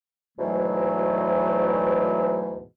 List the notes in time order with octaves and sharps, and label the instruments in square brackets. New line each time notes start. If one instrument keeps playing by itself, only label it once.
[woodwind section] D2 G#2 B2 E3 F#3 A3